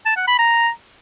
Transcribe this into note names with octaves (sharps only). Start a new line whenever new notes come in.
A5
F#5
B5
A#5